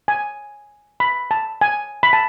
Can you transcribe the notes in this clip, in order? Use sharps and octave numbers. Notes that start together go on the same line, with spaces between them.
G#5
B5
A5
G#5
B5
A5